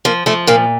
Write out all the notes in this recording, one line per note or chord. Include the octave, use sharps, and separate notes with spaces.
F3 A#3
F3 A3
A#2 A#3